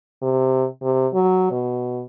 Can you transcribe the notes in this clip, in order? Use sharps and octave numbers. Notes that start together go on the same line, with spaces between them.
C3
C3
F#3
B2